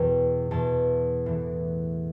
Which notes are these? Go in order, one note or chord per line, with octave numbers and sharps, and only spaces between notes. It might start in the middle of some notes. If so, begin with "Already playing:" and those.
Already playing: E2 B2 E3 G5
E2 B2 A5
A2 E3